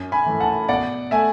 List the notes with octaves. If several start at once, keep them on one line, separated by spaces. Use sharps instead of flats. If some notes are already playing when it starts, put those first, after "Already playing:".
Already playing: F#2
G#5 B5
E3 A3
F#5 A5
B2 D5 F#5
A3 E5 G#5